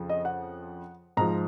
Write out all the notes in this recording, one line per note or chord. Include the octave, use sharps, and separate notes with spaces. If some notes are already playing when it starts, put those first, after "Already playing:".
Already playing: F2 C#3 F3
D#5
F#5
G#2 F3 A#5